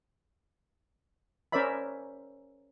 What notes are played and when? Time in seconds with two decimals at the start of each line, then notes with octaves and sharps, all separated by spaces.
1.52 C#4 A#4 C5 D5 E5 B5